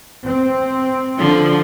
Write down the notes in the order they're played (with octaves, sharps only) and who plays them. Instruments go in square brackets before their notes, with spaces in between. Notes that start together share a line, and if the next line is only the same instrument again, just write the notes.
[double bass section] C4
[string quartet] D3 F3